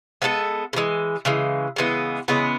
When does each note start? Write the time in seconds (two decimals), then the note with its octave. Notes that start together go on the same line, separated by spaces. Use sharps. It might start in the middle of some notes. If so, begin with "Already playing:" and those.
0.22 G#3 B3 E4 A4
0.73 C#3
0.76 E3 G#3
1.25 C#3 E3 G#3
1.76 C#3 E3 G#3 B3
2.28 C#3 E3 G#3 B3